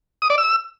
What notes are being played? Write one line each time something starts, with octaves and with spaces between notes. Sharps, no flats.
D#6
D5
E6